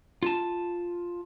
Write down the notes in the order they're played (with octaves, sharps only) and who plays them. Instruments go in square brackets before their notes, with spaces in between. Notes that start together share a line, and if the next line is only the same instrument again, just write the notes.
[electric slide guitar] F4 A5